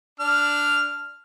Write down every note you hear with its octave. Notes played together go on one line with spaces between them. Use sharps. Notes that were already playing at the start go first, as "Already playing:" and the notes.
D4 F6